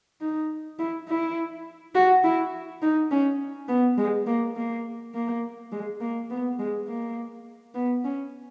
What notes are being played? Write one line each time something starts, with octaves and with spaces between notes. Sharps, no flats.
D#4
E4
E4
F#4
E4
D#4
C#4
B3
G#3
A#3
A#3
A#3
G#3
A#3
B3
G#3
A#3
B3
C#4